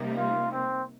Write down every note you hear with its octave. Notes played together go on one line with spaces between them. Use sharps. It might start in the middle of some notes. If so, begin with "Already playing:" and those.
Already playing: C3 G3 A#3 D#4
F4
C4